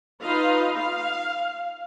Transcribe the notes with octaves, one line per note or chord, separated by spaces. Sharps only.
D#4 F4 B4 D#5 F5
F5